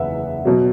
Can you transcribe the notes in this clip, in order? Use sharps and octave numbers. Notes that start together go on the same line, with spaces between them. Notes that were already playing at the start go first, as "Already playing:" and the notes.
Already playing: F#1 E2 C#3 B4 E5 F#5
B2 F#3